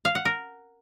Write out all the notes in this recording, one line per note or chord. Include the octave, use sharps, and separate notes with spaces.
F5
F#5
A#4